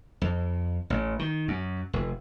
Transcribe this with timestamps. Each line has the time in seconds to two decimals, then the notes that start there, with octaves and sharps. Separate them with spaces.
0.22 F2
0.90 A1
1.19 D#3
1.48 F#2
1.93 F1